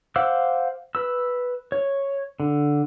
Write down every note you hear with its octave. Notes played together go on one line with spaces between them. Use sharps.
C5 F5 F#5 D6 E6
B4 E6
C#5
D3